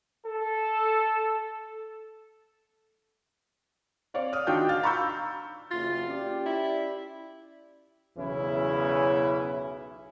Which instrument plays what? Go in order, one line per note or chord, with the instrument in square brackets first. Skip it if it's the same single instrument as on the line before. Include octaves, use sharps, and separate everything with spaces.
[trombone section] A4
[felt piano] C4 C#5 D5 F5
D#6 F6
D#3 D4 F4 F#4 G5 G6
F5 F6 A6
A#5 B5 C#6 E6 G6
[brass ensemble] F#1 E2 [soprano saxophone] F4
[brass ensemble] C#4 G4 D5
[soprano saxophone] E4
[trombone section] B1 E2 C#3 E3 C#4 E4